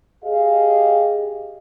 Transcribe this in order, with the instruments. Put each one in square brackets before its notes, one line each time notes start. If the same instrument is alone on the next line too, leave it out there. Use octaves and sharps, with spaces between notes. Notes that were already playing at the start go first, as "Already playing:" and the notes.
[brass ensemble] G4 G#4 D#5 F5